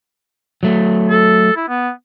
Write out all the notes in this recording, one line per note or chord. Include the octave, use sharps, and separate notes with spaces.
F#3 A3
A4
E4
B3